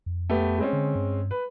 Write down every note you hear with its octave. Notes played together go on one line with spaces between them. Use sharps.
F2
A3 B3 G4
G#3 C4 C#4
D3
G2
B4